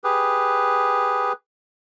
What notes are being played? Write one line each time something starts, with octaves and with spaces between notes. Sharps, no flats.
G4 G#4 B4